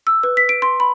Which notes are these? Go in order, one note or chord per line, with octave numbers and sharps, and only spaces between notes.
E6
B4
B6
D7
C6
B5